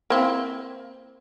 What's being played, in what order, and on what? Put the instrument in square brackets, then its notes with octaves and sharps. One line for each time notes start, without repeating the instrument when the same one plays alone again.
[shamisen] A#3 C4 E4